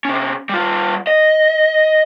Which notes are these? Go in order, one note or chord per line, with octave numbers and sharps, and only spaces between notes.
C3 C#4
G3 F4
D#5